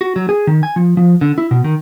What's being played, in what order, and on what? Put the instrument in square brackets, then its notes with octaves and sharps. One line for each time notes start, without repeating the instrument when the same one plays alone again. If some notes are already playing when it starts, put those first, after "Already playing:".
[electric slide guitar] F#4
F#3
G#4
D#3
G#5
F3
F3
D3
E4
B2
D#3